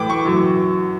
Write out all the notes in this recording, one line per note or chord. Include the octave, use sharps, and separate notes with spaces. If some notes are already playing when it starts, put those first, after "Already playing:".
Already playing: A2 E3 G5 D6
C#6
F#2 E3